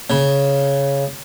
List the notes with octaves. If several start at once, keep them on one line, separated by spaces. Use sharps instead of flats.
C#3